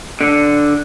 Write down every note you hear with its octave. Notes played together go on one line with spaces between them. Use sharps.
D3